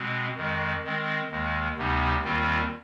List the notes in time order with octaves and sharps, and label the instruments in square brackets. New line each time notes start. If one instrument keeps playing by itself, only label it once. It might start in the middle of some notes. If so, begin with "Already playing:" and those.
Already playing: [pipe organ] B2 G#3 C4
F2 D#3 G#3
D#3 G#3 C4
D#2 D#3 G#3
D2 C3 G3 B3 D#4
D#2 D#3 G3 C4 F4